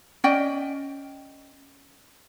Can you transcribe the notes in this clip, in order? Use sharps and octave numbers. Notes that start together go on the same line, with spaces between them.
C#4 D5 D#5 G5